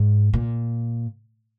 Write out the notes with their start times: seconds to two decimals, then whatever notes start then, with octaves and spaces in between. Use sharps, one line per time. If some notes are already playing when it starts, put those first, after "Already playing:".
Already playing: G#2
0.33 A#2